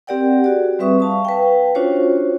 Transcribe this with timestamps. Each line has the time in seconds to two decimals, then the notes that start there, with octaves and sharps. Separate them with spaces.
0.07 C4 G4 A#4 D5 F#5 G5
0.44 F#4 G#4 D5
0.79 G3 C4 B4 E5 C#6 D#6
1.00 F5 A5 C#6
1.25 B4 F5 G5
1.75 C#4 D4 F4 F#4 C5 C#5